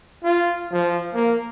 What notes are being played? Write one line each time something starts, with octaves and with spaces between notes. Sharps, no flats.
F4
F3
A#3